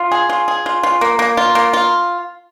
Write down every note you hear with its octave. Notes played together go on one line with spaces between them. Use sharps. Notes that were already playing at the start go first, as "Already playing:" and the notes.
Already playing: F4
G#4
F4
G#4
F4
F4
A#3
A#3
F4
A#3
F4